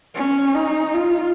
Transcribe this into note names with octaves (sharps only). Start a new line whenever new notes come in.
C#4
D#4
F4